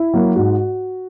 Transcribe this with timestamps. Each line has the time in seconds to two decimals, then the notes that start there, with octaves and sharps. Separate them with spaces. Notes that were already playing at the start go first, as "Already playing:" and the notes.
Already playing: E4
0.13 F#3 A#3
0.36 G#2 F#4